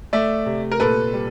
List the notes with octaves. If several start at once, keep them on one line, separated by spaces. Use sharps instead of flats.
A3 D5 E5
C3
A#4
A#2 A4 B4
G3